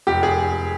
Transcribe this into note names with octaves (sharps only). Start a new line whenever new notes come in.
F1 G4
G#4